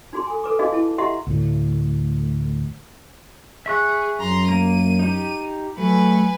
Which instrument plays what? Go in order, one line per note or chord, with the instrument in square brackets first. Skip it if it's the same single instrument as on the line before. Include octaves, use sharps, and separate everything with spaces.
[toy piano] D#4 F#4 G#4 C6
A4 G#5
A4 B4 D6
D#4 F#4 G#4 D#5 F5
E4 A5
G4 D#5 E5 F#5 A#5 C6
[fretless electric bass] D2 A2
[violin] G#4 [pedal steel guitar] E5 C#6 F#6
[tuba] F#2 [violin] A#5 C6
[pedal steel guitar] A#3 [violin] D#7
[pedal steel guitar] D#4 G4
[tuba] F#3 [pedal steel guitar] A3 [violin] B4 G#5